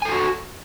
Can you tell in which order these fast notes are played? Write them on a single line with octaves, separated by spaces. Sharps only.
G#5 A4 F4 F#4